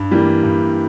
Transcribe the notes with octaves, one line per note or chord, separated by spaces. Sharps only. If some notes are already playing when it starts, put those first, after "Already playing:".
Already playing: G2
E3 G3 A#3
G2